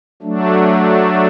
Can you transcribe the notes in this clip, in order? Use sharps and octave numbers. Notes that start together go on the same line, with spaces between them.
F#3 A3 D4